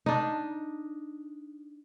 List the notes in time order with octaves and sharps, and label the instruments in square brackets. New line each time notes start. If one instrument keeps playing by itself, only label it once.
[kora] D4 D#4